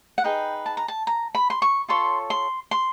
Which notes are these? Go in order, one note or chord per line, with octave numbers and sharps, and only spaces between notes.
F#5
D#4 G#4 B4 G5
A5
A#5
A5
A#5
B5
C6
C#6
F4 A4 C#5 C6
C6
C6